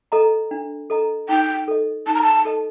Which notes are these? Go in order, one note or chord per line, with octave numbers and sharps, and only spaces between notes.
A4 D#5 A#5
D4
A4 D#5 A#5
D#4 G5
A4 D#5
D#4 A5
A#5
A5
A4 D#5